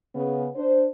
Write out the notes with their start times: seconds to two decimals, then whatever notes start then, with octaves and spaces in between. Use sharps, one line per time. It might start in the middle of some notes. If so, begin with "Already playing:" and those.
0.15 C#3 B3
0.55 D4 C5